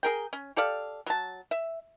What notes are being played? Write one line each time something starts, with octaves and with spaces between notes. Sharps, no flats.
G#4 A#4 G5
C#4
G4 A4 D5 F5
F#3 A5
E5